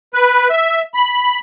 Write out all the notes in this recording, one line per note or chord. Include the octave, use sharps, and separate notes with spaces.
B4
E5
B5